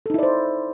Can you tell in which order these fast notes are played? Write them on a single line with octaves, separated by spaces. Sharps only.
A4 D#4 E4 D5 C5